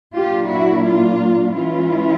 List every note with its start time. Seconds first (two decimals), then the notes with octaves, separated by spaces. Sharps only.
0.14 A#2 F#3 A#3 D4 F4 G4
0.49 E4 F#4
0.85 F4
1.55 E3 G#3 C#4 E4 F4